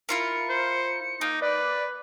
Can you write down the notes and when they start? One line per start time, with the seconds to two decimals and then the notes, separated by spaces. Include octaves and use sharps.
0.09 E4 F4 A#4 C#7
0.49 C5
1.21 A#3 D#4
1.42 B4 D5